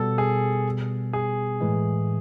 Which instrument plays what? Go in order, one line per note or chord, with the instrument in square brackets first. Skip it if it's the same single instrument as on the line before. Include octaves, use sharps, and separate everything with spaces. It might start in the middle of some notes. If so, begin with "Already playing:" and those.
Already playing: [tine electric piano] B2 G3 B3 [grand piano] A4
[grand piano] G#4
G#4
[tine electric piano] A2 E3 G#3